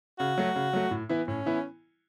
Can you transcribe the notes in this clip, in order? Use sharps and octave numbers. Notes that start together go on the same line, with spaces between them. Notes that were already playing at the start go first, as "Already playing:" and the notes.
C#3 F#4
F#3 A3
C#3
F#3 A3
A2
E3 B3 E4
A2 C#4
E3 B3 E4